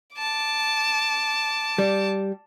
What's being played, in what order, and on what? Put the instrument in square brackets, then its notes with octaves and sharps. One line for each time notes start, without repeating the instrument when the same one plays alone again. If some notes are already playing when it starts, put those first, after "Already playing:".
[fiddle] A5 D6
[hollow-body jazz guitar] G3